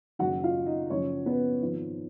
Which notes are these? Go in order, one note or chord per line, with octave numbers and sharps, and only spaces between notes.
F#1 F#2 D#3 F#3 F#4 F#5
F4 F5
D#4 D#5
F#1 F#2 F3 C#4 C#5
B3 B4
G#1 G#2 F3